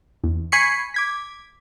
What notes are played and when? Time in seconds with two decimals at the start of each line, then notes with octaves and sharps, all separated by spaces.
0.24 E2
0.52 G#5 B5 C#6 C7 C#7
0.94 D6 G#6 B6